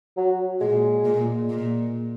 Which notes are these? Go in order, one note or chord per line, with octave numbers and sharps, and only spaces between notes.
F#3
A#2 G#3
A#2
A#2